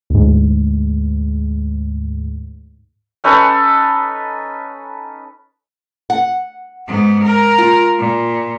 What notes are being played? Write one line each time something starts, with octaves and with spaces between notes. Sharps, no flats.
D2 G#2
C#4 D#4 A4 B4
F#5
G#2 B3
A#4
F4
A#2